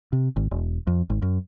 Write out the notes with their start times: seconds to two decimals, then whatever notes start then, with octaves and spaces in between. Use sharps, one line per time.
0.13 C3
0.36 G#1
0.51 E1
0.87 F2
1.10 G#1
1.22 F#2